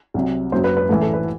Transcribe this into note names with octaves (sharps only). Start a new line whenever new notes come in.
C2 C3 F#3
F#1 F#2 F#3 C5
B4
B4
A1 A2 E3 A4
A4
B4